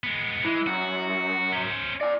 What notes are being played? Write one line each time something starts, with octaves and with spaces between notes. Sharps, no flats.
G#3 B3
E3 G#3
F#2 F#4
C#4 C5
D5 G#5